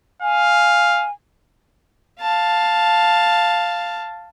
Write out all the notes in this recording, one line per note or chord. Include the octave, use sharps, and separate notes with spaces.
F5 G#5
F5 A5